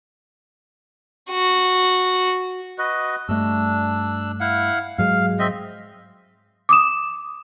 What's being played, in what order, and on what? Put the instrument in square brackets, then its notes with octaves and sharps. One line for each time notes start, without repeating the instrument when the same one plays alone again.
[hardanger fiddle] F#4
[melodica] F#4 B4 D#5
[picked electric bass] G2 A3 [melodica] D4 E6
[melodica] E4 F5 F#5
[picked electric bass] G#2 F#3 G#3 [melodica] F5
[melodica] C4 D#5 E5
[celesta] D6 D#6 E7